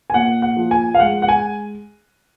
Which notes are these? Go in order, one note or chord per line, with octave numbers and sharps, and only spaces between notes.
G#5
A#2 F#5
F#5
F3
G#5
F5
G#3 F#5
F#5
G#5